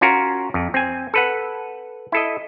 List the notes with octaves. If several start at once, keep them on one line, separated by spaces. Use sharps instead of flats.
C#4 F4 F#4 A#4
F2
C4 G#5
A4 B4 F#5
E4 A4 D#5